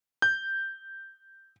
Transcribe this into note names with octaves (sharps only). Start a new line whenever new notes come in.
G6